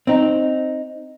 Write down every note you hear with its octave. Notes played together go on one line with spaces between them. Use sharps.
C4 D#4